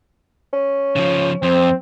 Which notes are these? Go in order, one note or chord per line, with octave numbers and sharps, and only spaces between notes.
C#4
C#3 F3
F2 C4